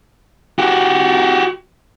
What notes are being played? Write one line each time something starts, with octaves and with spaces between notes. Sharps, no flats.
F#4 G4